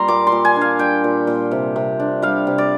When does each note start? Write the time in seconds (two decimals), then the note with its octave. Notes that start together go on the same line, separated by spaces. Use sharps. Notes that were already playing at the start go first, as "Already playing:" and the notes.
Already playing: G3 A#3 F4 A#5 C6
0.08 A#2 D6
0.27 C6
0.32 A#2
0.45 G#5
0.56 D4
0.61 F5
0.79 G3 G5
1.04 A#2
1.27 A#2
1.51 C3
1.76 C3
2.00 D4
2.22 G3 F5
2.47 C3
2.58 D5